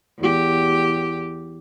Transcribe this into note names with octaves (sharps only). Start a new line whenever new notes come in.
E2 G4